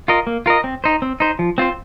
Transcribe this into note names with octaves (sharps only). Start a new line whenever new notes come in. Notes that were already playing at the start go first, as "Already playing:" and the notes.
F4 A#4 D#5
A#3
F4 A#4 D#5
C4
D#4 C5
C4
D#4 C5
F3
C4 F4 C5